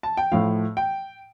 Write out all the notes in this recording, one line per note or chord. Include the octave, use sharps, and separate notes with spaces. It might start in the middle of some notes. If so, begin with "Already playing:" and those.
A5
G5
A2 F3 F5
G5